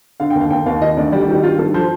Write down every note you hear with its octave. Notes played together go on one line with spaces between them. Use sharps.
D3 F5
G5
D#2 F5
D#2 G5
D#2 F5
D#3 D#5
D2 D5
G3 D5
G4
D#3 D#4
G2 F4
G2 A4
F3 C5